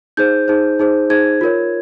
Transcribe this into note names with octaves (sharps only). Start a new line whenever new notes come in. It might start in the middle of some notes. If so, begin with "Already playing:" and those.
D#4 G#4 C5 G6
D#4 G#4 C5
D#4 G#4 C5
D#4 G#4 C5 G#6
F4 A#4 C#5